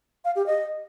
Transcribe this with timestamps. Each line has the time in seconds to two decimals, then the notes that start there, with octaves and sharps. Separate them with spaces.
0.25 F5
0.36 G4
0.47 D#5